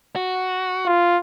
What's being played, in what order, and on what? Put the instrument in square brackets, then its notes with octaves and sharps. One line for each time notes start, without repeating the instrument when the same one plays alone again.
[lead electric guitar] F#4
[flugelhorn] F4